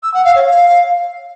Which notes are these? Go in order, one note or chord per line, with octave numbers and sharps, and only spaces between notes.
E6
F#5
F5
C#5
F5